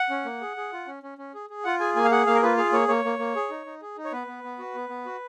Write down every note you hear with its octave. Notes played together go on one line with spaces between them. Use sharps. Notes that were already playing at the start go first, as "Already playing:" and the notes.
Already playing: F#5
C#4
A#3
G#4
G#4
F4
C#4
C#4
C#4
G#4
G#4
F4 F#5
G#4 G#5
A#3 G#5
F5
G#4 F#5
A#3 F5
A#4
F4 B4
G#4 F5
A#3 C#5
A#3 C#5
A#3
A#3
G#4
D#4
D#4
G#4
D#4
C#5
B3 B4
B3
B3
F#4
B3
B3
F#4